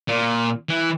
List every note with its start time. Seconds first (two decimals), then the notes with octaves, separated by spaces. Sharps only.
0.08 A#2
0.69 E3